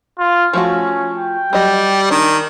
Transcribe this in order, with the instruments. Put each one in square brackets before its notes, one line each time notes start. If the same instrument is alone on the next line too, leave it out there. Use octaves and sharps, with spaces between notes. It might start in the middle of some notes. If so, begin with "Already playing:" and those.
[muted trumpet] F4
[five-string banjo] F3 A3 F#4 [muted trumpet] C#4
[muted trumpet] G5
[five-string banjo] F#3 D#5 [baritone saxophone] G3
[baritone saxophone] D#3 [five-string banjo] D4